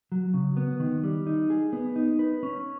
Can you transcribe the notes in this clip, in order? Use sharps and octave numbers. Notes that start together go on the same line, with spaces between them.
F#3
C#3
B3
D#3
G3
D#4
G#4
B3
D#4
B4
C#4